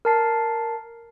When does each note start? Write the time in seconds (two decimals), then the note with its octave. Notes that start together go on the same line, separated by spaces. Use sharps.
0.05 A#4 A5 C7